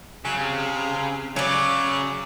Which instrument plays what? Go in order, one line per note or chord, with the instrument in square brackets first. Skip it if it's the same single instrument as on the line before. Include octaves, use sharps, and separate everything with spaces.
[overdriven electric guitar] C#3 [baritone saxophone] F#3
[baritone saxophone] C3
[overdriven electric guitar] C#3 [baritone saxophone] F#3 [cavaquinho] C#5 D5